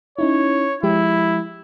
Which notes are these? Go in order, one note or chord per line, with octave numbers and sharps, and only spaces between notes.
C#4 D#4 E4 C#5
F3 G#3 E4 G4